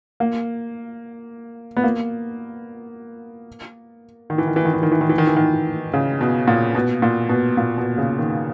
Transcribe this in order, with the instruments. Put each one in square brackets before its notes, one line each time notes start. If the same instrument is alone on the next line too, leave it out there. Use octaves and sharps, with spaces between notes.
[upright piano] A#3
B3
A#3
D#3
E3
D#3
E3
D#3
E3
D#3
E3
D#3
E3
D#3
E3
D#3
C#3
B2
A#2
B2
A#2
B2
A#2
B2
C#3
D#3